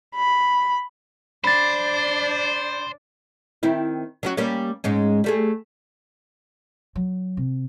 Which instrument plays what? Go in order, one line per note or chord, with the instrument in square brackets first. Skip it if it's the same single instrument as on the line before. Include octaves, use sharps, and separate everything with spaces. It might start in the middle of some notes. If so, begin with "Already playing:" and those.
[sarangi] B5
[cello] D4 D5 [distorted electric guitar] C5 [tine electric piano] B5 A6
[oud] D#3 C4 E4
F#3 C#4 F#4
G3 A#3 C#4
G#2 G#3 C#4
G3 A3 G#4
[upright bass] F#3
C3